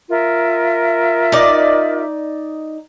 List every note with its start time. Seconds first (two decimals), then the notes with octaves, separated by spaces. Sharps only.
0.09 F4 A#4 E5
1.32 D#4 D5